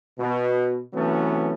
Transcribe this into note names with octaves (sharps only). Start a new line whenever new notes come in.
B2
C3 E3 F#3 A3 B3 C#4